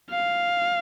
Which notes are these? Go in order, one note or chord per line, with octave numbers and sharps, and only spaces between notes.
F5